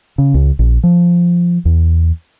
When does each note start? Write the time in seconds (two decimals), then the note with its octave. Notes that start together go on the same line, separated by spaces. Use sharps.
0.18 C#3
0.34 C#2
0.59 A#1
0.83 F3
1.65 E2